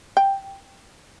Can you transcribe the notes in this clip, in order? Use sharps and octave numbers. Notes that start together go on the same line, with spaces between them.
G5